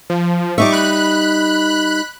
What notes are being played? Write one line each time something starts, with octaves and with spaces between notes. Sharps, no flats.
F3
G3 D#4 E5 C#6 D6
B5 F#6